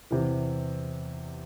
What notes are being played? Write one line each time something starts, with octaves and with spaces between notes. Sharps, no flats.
E2 C3 E3